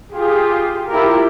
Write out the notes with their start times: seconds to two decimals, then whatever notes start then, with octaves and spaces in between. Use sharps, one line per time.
0.12 F4 G4 G#4
0.89 E4 F4 G4 A#4